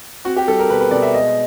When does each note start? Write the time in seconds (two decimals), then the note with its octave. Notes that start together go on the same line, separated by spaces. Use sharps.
0.25 C4 F#4
0.36 G4
0.47 G3 A4
0.59 A#4
0.70 B2 B4
0.81 B4
0.91 B2 D5
1.02 E5
1.13 G#3 D#5